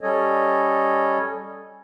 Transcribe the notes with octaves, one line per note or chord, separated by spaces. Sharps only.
G3 C#4 A4 C#5 D#5